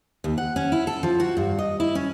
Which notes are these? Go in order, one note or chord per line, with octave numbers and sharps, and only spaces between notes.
D#2
F#5
C#4
E4
A4
F3
F#4
G2
D#5
E4
C#4